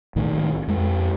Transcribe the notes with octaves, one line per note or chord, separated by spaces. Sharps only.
B1 A2 D#3
F2 G#3